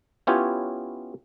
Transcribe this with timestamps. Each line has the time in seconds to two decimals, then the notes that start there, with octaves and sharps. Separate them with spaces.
0.27 B3 C#4 E4 F4 G4 C#5